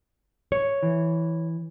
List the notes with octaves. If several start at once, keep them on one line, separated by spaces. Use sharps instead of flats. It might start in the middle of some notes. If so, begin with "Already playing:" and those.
C#5
E3